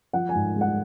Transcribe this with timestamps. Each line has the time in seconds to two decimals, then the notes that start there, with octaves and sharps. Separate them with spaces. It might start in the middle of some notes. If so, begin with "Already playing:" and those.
0.13 F3 F#5
0.29 G#5
0.35 G#2
0.56 G#3
0.61 F#5